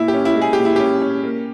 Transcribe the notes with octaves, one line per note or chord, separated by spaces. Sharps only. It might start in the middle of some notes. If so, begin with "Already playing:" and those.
Already playing: A#2 E4
G4
C#4
E4
G#3
G#4
A#2 G4
E4
C#4 G4
C#4
A#3